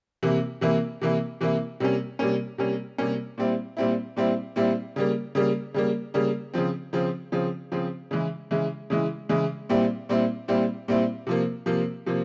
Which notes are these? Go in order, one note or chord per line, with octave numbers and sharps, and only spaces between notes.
C3 E3 A#3 E4
C3 E3 A#3 E4
C3 E3 A#3 E4
C3 E3 A#3 E4
C3 G3 A#3 C#4
C3 G3 A#3 C#4
C3 G3 A#3 C#4
C3 G3 A#3 C#4
A#2 G3 C4 E4
A#2 G3 C4 E4
A#2 G3 C4 E4
A#2 G3 C4 E4
C#3 G3 A#3
C#3 G3 A#3
C#3 G3 A#3
C#3 G3 A#3
C#3 F3 C4
C#3 F3 C4
C#3 F3 C4
C#3 F3 C4
C#3 E3 G#3 E4
C#3 E3 G#3 E4
C#3 E3 G#3 E4
C#3 E3 G#3 E4
A#2 G3 C4 E4
A#2 G3 C4 E4
A#2 G3 C4 E4
A#2 G3 C4 E4
C3 F3 A#3
C3 F3 A#3
C3 F3 A#3